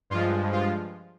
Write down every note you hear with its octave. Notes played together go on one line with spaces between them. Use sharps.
G2 F3 G#3 F4
F4